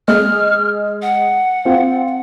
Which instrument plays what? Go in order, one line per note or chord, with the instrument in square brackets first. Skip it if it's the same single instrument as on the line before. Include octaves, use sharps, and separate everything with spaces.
[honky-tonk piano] G#3 [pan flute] F6
[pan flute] F#5
[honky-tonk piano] C4 F4